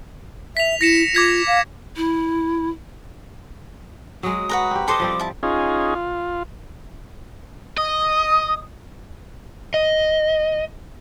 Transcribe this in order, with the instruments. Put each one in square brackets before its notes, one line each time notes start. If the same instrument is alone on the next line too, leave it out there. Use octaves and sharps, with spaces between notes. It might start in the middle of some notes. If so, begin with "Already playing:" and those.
[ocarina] E5 [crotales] B6 F7
[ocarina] E4 [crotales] A#6 C#7 E7
[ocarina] F4 [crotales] D6 G#6 B6
[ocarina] F5
[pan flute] E4
[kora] F#3 G#3 [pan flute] D#6
[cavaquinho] F#4 B4 A#5
[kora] C4 G4
[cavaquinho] A4 C5 C6 [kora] B4 D#5 [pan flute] D6
[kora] F3 G3 C4
[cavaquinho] E4 A5
[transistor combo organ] C#4 D#4 F4 G#4
F4
[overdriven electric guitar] D#5 [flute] D#6
[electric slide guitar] D#5